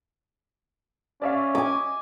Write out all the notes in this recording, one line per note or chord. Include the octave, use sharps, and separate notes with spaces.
C#4 D5 E5 F5
D#5 G#5 D6